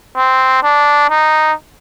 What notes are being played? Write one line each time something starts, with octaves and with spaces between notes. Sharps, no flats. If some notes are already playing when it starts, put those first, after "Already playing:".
C4
D4
D#4